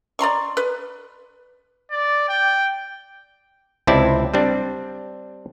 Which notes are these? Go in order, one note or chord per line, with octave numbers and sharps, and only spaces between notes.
D5 A#5 C6 C#6
B4
D5
G5
C#2 C3 C4 E4 D5 A5
G3 C4 D4